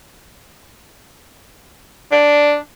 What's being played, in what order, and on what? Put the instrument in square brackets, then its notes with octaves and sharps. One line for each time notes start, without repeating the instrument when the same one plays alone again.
[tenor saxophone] D4